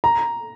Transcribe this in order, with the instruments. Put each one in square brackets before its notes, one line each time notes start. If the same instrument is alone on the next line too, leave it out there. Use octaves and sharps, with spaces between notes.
[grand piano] A#5